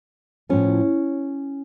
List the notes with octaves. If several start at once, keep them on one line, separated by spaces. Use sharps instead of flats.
A2 F3 C#4